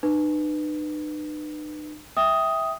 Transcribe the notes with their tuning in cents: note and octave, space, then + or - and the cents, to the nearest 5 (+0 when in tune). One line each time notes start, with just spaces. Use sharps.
D#4 -45 B4 +0
E5 -10 G5 +0 D#6 +5